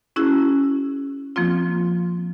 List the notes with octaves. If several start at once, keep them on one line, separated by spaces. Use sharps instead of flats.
C#4 E4 F#4 G#4
F3 A#3 C4 F4